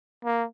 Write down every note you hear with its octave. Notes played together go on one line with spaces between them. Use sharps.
A#3